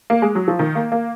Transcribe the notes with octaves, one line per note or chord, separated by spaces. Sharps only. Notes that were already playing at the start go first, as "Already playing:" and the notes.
A#3
G#3
F#3
F3
D#3
A#3
A#3